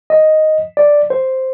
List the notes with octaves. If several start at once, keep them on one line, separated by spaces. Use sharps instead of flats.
D#5
D5
C5